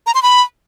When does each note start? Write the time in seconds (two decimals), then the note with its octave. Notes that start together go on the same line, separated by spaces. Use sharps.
0.07 A#5
0.15 C6
0.23 B5